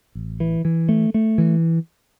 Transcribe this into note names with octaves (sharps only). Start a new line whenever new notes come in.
A1
E3
E3
A3
A3
E3